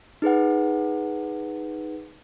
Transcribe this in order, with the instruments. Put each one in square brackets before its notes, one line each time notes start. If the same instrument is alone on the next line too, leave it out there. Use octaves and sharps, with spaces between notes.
[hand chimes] D#4 G#4 B4 F#5